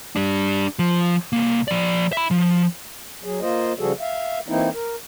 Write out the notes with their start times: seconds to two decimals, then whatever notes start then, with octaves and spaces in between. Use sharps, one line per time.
0.16 G3 D4
0.79 F3
1.33 C2 A#3
1.68 F3 D5
2.13 E5 B5
2.31 F3
3.24 F#3 G#4
3.41 A#3 F4 C5 D#5
3.79 C#3 F3 G3 F#4 G#4 A4
4.00 E5 F5
4.48 E3 A#3 C4 D#4 E4
4.74 A#4